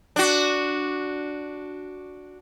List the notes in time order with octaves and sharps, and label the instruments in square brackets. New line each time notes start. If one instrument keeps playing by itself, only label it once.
[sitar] D4 F#4